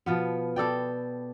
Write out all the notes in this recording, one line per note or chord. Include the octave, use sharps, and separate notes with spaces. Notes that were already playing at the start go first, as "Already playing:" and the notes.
B2 F3 B3
B2 A4 D5 G5